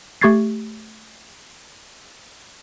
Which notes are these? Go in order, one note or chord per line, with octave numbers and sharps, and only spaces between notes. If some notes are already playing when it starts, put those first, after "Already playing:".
A3 G4 C#6 G#6 A6 C7